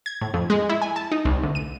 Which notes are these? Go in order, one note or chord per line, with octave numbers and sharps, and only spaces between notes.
G#6
A2
F2
G#3
E4
G#5
A5
D#4
C2
D2
D#7